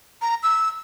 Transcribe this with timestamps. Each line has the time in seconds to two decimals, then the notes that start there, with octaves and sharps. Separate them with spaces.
0.22 A#5
0.43 E6